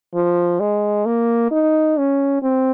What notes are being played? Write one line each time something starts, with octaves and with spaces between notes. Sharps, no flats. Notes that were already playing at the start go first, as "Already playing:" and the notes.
F3
G#3
A#3
D#4
C#4
C4